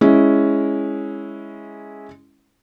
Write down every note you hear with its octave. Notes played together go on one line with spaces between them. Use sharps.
G#3 C#4 E4